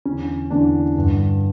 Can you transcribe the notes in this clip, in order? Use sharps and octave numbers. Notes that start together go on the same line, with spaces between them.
E2 D3 C#4
E2 D3 D4
G2 D3